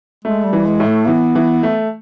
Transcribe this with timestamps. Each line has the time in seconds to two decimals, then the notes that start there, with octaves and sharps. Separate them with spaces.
0.25 G#3 A3
0.45 G3
0.53 E3
0.66 G#3
0.80 A2
0.87 A3
1.08 E3 B3
1.35 E3
1.63 A3